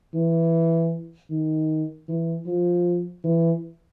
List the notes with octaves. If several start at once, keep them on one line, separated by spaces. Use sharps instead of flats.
E3
D#3
E3
F3
E3